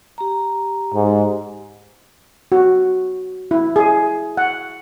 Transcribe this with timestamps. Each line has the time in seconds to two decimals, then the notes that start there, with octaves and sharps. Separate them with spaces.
0.18 G4 A#5
0.94 G#2
2.52 F#4
3.51 E4
3.76 G#4
4.37 F#5